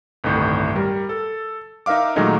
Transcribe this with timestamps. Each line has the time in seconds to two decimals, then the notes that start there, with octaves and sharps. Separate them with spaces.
0.24 G1 C2 A2 D#3
0.76 G3 A#4
1.09 A4
1.86 D#4 A#4 E5 F5 D6
2.16 A#2 D#3 F#3 G#3 A3 D#4